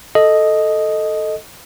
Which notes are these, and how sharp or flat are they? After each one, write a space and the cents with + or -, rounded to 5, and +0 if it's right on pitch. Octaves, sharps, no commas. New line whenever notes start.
A4 +0 D#5 +0